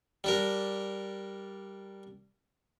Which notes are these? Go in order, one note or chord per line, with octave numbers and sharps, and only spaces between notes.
G3 D4 A#4